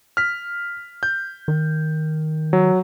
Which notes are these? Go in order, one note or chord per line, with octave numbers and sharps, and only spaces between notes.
F6 B6
G6
D#3
F#3